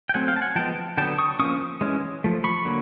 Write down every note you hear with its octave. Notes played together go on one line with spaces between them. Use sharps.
G5
F#3 A3 C4 F#5 G#5
F5 G5
A5
F#5 G#5
F3 G#3 B3 G5 A5
D3 F#3 B3 G5 A5
C#6 D#6
F3 A#3 C#4 C#6 D#6
E3 G#3 C#4
F3 A3
B5 C#6
D3 F#3 A#3